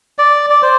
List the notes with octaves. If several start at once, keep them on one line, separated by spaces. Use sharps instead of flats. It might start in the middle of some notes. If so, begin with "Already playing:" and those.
D5
D5
C5